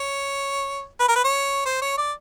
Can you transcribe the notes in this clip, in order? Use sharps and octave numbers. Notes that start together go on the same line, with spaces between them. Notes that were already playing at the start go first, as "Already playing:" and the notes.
Already playing: C#5
B4
A#4
B4
C#5
C5
C#5
D5